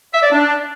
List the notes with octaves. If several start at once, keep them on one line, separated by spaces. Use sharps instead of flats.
E5
D5
D4